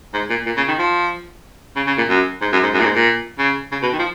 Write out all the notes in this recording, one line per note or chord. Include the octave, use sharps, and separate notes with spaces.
G#2
A#2
A#2
C#3
D#3
F3
C#3
C#3
A#2
F#2
G#2
F#2
G#2
F#2
A#2
G#2
A#2
C#3
C#3
B2
D#3
F3